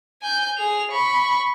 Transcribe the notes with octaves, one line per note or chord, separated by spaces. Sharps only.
G#5 G6
G#4 F7
B5 C#6